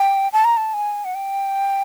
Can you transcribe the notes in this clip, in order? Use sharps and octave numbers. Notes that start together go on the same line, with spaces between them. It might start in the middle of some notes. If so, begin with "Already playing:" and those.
Already playing: G5
A5
A#5
A5
G#5
F#5
G5